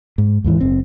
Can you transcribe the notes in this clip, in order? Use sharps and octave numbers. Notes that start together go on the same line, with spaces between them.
G#2
D#2 G#2 E3
F#1 C4